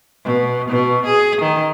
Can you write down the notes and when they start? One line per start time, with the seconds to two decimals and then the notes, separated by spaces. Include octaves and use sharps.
0.25 B2
0.69 B2
1.06 G#4
1.42 D#3